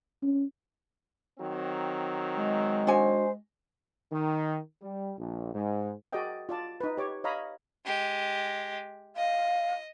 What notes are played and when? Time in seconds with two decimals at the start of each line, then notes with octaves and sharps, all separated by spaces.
0.23 C#4
1.39 D#3 F#3 C4
2.37 G#3
2.87 D4 F#4 C5 G#5
4.12 D#3
4.82 G3
5.18 A#1
5.54 G#2
6.13 F#4 G#4 A#4 D5 D#5 G5
6.49 F4 D5 A5
6.81 D#4 B4
6.97 G4 C#5 D6
7.24 C#5 D#5 F5 A#5 B5
7.85 G#3 G4
9.16 D#5 F5